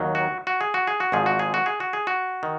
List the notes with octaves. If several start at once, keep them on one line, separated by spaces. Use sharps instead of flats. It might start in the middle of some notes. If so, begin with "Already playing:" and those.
Already playing: D#2 D#3 F#3
F#4
F#4
G#4
F#4
G#4
F#4
G#1 G#2 F3 G#4
F#4
G#4
F#4
G#4
F#4
G#4
F#4
D#3